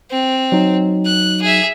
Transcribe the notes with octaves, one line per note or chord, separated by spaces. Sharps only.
C4
F#3 D#4
F#6
G#4 E5